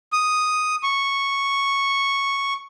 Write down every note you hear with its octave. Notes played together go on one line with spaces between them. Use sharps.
D#6
C#6